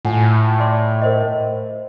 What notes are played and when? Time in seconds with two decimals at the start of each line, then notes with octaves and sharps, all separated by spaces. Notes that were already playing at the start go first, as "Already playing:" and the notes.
0.05 A2 F4 F#5 G#5
0.60 D5 C6 D6
1.02 A#4 C5 D#5